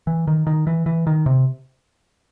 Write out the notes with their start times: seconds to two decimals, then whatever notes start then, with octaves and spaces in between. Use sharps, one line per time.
0.07 E3
0.27 D#3
0.47 D#3
0.67 E3
0.86 E3
1.07 D#3
1.26 C3